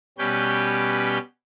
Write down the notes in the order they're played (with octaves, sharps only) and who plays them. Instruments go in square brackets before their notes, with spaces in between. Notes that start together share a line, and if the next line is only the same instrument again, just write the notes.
[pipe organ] B2 G3 C#4 G4 B4 G6